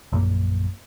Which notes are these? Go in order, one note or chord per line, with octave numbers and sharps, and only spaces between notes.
A#1 F#2 A#3